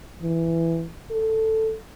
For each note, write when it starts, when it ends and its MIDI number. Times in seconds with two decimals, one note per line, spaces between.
0.22 0.87 52
1.11 1.75 69